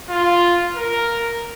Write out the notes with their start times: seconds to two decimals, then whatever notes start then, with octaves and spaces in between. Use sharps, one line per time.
0.10 F4
0.76 A#4